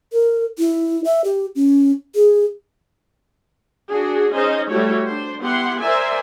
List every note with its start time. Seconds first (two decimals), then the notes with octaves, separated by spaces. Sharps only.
0.12 A#4
0.59 E4
1.04 E5
1.24 G4
1.56 C#4
2.15 G#4
3.89 D4 F#4 G#4
4.33 C#4 D#4 G#4 C5 D#5
4.70 G3 A3 E4 F#4 G4 C#5
5.05 D4 C5
5.41 B3 E4 G4 F#5 C6
5.80 A#4 C5 D5 E5 G#5